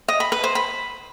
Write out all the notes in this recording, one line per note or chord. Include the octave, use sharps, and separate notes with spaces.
D#5
B5
B4
C5
B5